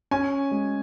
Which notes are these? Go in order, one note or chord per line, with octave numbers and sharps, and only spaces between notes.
C#4 G#5
G#3